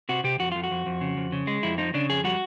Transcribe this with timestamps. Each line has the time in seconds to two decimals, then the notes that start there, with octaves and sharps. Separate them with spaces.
0.09 C3 F#4
0.24 C3 G4
0.39 F2 F#4
0.52 F2 F4
0.64 F#4
0.71 F2
0.86 F2
1.01 C#3
1.17 F2
1.32 C#3
1.47 G#3
1.63 F2 E4
1.78 F3 D#4
1.94 C#3 D4
2.09 F2 G#4
2.24 G3 F#4